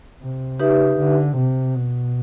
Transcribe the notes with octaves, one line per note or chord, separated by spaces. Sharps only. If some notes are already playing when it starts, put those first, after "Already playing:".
C3
C#3 D#4 G4 B4 E5
D3
C3
B2